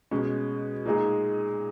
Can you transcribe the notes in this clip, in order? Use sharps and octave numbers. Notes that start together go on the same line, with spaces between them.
B2 G#3 C#4
A#2 G#3 D#4 G#4